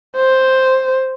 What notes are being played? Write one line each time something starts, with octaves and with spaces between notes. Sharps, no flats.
C5